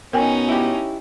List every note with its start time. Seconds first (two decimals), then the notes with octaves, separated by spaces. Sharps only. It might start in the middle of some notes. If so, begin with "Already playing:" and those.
0.13 B2 C#4 D#4 A#4 G5 G#5
0.49 E4 G4